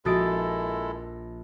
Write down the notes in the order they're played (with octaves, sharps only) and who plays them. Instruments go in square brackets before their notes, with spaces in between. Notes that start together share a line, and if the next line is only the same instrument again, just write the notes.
[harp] A#1 A6 D7 [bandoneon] G#3 E4 A4 [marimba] F#4 D#6